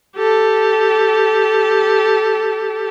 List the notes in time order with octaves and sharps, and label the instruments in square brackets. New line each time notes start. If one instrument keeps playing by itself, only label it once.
[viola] G4 A4